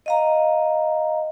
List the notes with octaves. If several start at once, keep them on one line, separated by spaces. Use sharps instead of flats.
D#5 F5 A#5